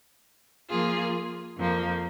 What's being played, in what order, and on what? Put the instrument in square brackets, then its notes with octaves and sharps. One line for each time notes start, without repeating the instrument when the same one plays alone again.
[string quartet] F3 A#3 F4 G#4
F2 F3 A#3